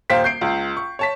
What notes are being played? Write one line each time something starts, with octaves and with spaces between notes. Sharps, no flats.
D#1 C5 F5 G5 B6
G6 C7 D7
C#2
C#6
C#5 A5 B6